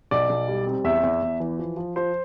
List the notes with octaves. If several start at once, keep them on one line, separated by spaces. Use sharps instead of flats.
B1 D5
B1
G3
C4
E2 E5
E2
E2
E3
F3
F3
F3 C5